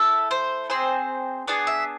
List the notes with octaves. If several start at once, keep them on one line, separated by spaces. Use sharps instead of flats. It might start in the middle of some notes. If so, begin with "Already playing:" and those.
Already playing: A3 E4 A4
C5
C4 G#4 C5
B3 D4 G#4 D5
E5